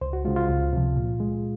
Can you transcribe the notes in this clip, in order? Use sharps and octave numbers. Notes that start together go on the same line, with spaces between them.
C#2 C5
F#4
C#3 G#3 F4
F4
C#2
C3 F3
A#2
G#3